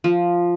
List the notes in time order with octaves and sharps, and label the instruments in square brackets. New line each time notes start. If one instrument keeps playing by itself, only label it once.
[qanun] F3